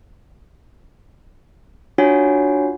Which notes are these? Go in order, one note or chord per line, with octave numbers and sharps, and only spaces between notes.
D4 F4 F#4 C#5 F#5 G#5